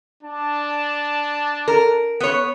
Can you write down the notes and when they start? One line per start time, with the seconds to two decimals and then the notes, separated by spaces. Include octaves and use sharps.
0.24 D4 A5
1.68 A#4
2.20 B3 C#5